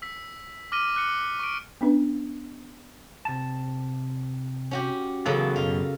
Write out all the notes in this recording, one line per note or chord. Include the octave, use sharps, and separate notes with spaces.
E6 B6
D6 F6 A#6 D#7 G7
D6 F#6 C#7
C#6 D7
B3 C#4 D4 B4
C3 A5
C#4 F#4 G4
C#3 E3 F#3 A#3 B3 A4
F#2 B2 F4